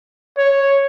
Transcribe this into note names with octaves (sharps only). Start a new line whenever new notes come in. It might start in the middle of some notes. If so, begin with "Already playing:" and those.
C#5